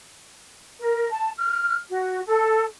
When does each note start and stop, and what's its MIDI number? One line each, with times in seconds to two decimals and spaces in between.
0.78 1.09 70
1.10 1.29 81
1.37 1.76 89
1.89 2.19 66
2.26 2.64 69